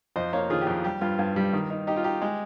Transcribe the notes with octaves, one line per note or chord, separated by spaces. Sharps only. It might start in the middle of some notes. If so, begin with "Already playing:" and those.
F2 C5 D#5
A#3 C#5 F5
D#3 F4 G#4
G4
F2
G3 G4
G2 F4
G2
G3
D#3
D#4
D#4 G4
F4
D#4 G4
G#3